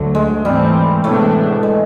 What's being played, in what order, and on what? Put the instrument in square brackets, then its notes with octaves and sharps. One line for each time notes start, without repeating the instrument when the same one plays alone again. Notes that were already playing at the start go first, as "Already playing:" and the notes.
Already playing: [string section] D2 D3 F#3 A3
[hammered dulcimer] G#3
[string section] G#2 E3 A3 C4 [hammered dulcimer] G3
[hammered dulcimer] A2 A3 [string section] C3 E3 G#3 B3 D4
[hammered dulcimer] G#3